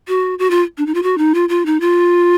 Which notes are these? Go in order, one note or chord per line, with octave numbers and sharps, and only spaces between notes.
F#4
F#4
F4
D4
D#4
F4
F#4
D#4
F4
F4
D#4
F4